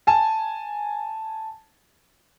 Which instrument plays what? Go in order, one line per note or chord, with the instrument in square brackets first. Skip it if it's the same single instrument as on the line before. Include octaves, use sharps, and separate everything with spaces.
[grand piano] G#5 A5